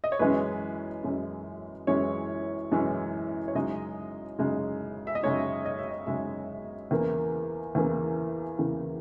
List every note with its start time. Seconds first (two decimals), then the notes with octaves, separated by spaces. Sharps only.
0.04 D#5
0.12 C#5
0.19 F#2 E3 G#3 C#4 B4
1.03 F#2 E3 G#3 C#4
1.87 F#2 E3 G#3 C#4 C#5
2.72 F#2 E3 G#3 C#4
3.48 C#5
3.55 F#2 C#3 G#3 D#4 D#5
4.39 F#2 C#3 G#3 D#4
5.07 E5
5.15 D#5
5.23 F#2 C#3 G#3 D#4 C#5
5.65 D#5
5.78 E5
5.91 D#5
6.07 F#2 C#3 G#3 D#4 E5
6.91 E2 C#3 E3 A#3
7.75 E2 C#3 E3 A#3
8.59 E2 C#3 E3 A#3